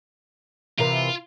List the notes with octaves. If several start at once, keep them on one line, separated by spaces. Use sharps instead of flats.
C3 E3 F4 A#4